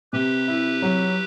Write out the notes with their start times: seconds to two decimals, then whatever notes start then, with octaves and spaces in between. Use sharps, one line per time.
0.12 C3 G4 B4
0.48 E4
0.82 F#3